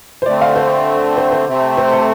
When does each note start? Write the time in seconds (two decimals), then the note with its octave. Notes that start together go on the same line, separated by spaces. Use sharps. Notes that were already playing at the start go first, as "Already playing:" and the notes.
0.22 C5
0.26 D3 A3 C4 D5
0.41 F5
0.56 C5
1.17 C5
1.32 C5
1.47 C3 A3 C4
1.77 C5
1.93 A4